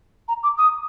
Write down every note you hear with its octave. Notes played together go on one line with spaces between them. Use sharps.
A#5
D6
D#6